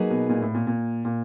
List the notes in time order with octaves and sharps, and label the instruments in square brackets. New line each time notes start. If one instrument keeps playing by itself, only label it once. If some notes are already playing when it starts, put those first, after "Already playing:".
Already playing: [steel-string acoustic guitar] F#3 A#3 D#4 G#4 B4
[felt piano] B2
A#2
A2
A#2
A#2
A#2